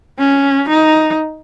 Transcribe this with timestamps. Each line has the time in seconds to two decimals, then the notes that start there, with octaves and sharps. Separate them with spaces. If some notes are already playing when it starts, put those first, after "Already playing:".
0.19 C#4
0.69 D#4